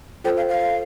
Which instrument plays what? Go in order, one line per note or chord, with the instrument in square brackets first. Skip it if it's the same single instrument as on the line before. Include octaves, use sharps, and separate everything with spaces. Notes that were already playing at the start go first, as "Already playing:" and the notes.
[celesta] F4 A4 C5 [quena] G5
[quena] F5
F5